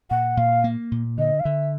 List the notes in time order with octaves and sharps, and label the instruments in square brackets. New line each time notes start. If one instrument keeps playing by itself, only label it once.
[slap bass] A#2 [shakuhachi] F#5
[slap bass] A#2 [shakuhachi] F5
[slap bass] A#3
A#2
[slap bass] D3 [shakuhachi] D#5
[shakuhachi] F5
[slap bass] D3 [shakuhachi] E5